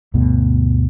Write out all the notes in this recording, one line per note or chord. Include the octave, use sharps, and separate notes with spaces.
D2 G2 B2 A3